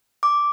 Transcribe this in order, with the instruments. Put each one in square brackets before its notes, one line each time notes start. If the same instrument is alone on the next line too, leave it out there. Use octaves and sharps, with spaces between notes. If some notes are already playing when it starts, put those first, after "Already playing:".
[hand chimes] D6